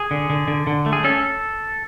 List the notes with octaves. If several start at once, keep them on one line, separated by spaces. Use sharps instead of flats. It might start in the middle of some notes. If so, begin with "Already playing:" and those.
Already playing: G#4
D3
D3
D3
D3
A3
G#4
C#4 A4